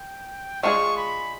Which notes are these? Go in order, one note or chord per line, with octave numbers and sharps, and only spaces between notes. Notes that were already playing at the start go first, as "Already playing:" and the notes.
Already playing: G5
G#3 B3 D4 F4 G#4 C#6
B5